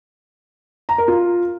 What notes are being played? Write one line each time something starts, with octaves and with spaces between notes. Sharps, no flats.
A#5
A#4
F4